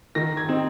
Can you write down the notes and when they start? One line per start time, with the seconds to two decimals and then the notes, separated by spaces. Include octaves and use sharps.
0.15 D#3 A#6
0.37 G#6
0.49 C4 D#4